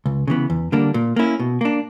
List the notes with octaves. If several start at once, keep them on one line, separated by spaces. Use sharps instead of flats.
C#2
C#3 E3 B3
E2
D3 G3 A#3 D4
A#2
A#3 C#4 E4
B2
A#3 D4